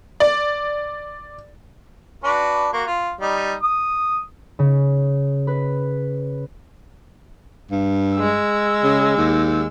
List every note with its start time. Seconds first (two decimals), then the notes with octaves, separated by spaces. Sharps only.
0.20 D5
2.24 D4 F#4 B4
2.73 A#3 F#4
2.87 F4
3.21 G3 D#4
3.63 D#6
4.59 C#3
5.47 B4
7.71 G2
8.15 G#3 E6
8.84 C#3
9.17 D#2